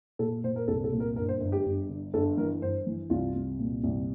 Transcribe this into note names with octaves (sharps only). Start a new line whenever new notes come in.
A#2 A4
A#2 C5
A#4
C2 A4
A4
A#2
A#4
G1 A#4
C5
G1
G4
G1
D3
G1 A4
E3 A#4
G1 C5
E3
C2 F4
C2
A#2
C2